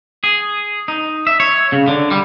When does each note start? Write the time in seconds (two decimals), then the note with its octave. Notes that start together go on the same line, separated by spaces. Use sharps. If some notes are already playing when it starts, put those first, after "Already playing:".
0.24 G#4
0.88 D#4
1.27 E5
1.40 C#5
1.72 C#3
1.88 D3
2.11 G3